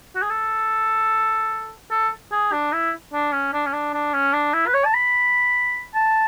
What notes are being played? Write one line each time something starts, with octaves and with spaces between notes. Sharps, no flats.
F#4
G#4
A4
A4
G#4
D4
E4
D4
C#4
D4
C#4
D4
D4
C#4
D4
E4
B4
C#5
A5
B5
A5